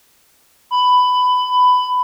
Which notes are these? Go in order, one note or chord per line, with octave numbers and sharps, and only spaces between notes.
B5